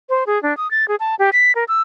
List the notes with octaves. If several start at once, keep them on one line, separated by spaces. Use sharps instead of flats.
C5
G#4
D4
D#6
A6
G#4
A5
G4
B6
A#4
E6